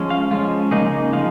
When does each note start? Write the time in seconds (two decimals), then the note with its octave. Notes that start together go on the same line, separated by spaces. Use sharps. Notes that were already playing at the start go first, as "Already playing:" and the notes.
Already playing: F3 G#3 C#4
0.10 F5
0.31 F3 G#3 C#4 F4
0.71 C#3 A#3 D#4 G#4
0.86 G#4
1.13 F3 G#3 D#4 F5